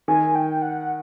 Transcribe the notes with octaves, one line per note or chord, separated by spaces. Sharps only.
D#3 G#5
G5
F#5